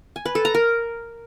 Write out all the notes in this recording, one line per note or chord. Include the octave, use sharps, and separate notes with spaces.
G#5
B4
A4
A#5
A#4